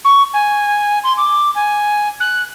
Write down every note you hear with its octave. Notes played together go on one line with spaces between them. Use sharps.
C#6
G#5
C6
D6
G#5
F#6